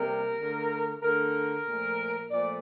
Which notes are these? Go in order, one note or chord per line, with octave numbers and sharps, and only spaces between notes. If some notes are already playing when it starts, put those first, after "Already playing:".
Already playing: C3 G3 A#3 A#4
D3 A3
D3 A3 A#4
A#2 F3 A3
A#2 F3 A3 D5